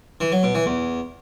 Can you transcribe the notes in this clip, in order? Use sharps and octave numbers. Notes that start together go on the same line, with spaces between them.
E3
F#3
B2
E3
E2